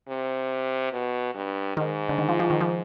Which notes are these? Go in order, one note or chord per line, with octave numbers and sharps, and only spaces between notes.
C3
B2
G2
G#2 D#3
D3
D#3
F3
F3
D#3
F3